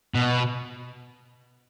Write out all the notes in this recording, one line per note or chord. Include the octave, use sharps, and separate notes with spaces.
B2